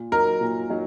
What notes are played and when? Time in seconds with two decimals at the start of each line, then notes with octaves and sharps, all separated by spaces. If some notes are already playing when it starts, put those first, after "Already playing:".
Already playing: A#2
0.12 F#3 D#4 A#4
0.41 A#2
0.70 F#3 D#4